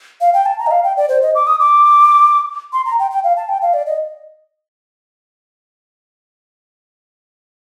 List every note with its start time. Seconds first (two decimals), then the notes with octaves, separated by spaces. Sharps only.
0.21 F5
0.34 G5
0.46 A5
0.59 A#5
0.67 D#5
0.71 F5
0.84 G5
0.97 D5
1.09 C5
1.22 D#5
1.35 D6
1.47 D#6
1.60 D6
2.73 C6
2.85 A#5
2.99 G5
3.11 G5
3.24 F5
3.37 A5
3.49 G5
3.62 F5
3.74 D5
3.86 D#5